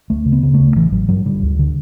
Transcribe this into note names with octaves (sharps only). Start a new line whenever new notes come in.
D2 A3
C#3
B3
C#3
A3
D2
A1 E3
A1 F#3
G2 F#3
D3 G3
D2
D3